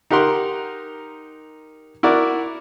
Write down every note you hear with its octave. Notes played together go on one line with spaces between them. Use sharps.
D#4 G4 A#4 F#5 C6
E4 F#4 A#4 D5